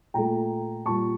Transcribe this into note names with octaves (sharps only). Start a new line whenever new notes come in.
A#2 A3 G5 A#5
A#2 G3 A5 C#6